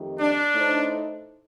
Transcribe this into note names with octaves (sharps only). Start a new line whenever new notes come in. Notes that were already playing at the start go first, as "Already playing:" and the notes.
Already playing: F2 D#3 A3 D#4 G4
D4
A2 A3 D#4 A4 C5